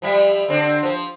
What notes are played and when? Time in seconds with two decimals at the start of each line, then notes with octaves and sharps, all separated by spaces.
0.02 F3 G3 E5
0.48 D3 C4 D4
0.83 F3 C5